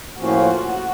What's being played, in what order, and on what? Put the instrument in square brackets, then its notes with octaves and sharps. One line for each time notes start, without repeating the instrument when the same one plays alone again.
[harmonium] A2 F3 A#3 C#4 F4 [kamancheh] F#4